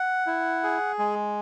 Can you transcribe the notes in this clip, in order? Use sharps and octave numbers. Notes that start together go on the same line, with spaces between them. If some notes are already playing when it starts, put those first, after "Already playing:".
Already playing: F#5
E4
G#4
G#3